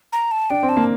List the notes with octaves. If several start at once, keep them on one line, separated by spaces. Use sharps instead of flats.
A#5
A5
D4 G5
C4
A5
A#3